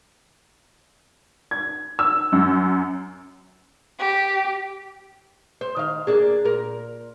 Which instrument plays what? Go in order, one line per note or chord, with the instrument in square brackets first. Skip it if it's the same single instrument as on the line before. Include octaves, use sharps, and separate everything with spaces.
[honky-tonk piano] G#6
E6
F#2
[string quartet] G4
[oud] C5
D#3 F5
A#3 D4 G#4
A#2 A#4